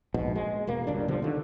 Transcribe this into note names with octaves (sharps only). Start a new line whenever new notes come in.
A#1 G#2 B2
G#3
E1 B2 A#3
F#1 C#2 G2 D4
B2 D3 F3 G3
D3 D#3